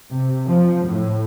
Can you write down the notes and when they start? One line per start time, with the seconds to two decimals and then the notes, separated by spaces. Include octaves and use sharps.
0.10 C3
0.47 F3
0.87 A2